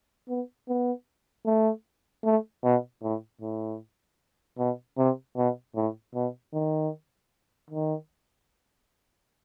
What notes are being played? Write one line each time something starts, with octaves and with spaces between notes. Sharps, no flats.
B3
B3
A3
A3
B2
A2
A2
B2
C3
B2
A2
B2
D#3
D#3